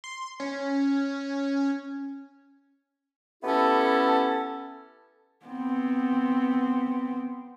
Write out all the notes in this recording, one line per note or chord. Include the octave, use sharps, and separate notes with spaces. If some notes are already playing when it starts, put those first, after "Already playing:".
C6
C#4
A3 B3 C#4 E4 G4 A4
B3 C4